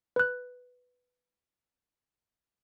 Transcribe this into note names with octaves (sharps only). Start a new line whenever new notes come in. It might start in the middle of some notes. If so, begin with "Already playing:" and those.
B4 F#6